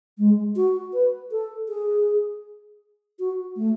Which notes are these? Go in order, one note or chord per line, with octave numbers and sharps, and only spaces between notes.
G#3
F#4
B4
A4
G#4
F#4
A3